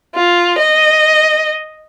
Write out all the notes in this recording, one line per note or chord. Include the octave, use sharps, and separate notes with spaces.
F4
D#5